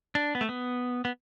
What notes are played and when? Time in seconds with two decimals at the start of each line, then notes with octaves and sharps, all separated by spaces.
0.15 D4
0.35 B3
0.41 A3
0.49 B3
1.05 B3